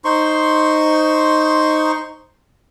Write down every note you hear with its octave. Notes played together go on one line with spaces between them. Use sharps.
D#4 C5 C6 C#6